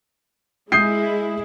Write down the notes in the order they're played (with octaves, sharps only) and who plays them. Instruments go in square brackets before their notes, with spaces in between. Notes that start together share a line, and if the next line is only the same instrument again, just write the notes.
[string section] G#3 E4 [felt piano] D#6 G6 C7